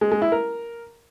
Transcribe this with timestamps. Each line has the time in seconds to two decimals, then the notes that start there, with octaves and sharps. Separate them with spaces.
0.01 G#3
0.12 G#3
0.22 E4
0.32 A#4